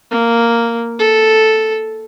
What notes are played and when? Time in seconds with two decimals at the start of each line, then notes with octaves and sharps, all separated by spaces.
0.11 A#3
0.99 A4